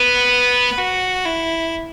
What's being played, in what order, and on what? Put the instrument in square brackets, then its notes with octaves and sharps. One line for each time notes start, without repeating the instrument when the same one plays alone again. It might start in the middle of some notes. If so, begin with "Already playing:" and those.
Already playing: [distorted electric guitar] B3 [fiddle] B4
[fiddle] F#4
E4